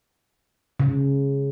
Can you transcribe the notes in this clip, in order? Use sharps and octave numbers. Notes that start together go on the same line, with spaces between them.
C#3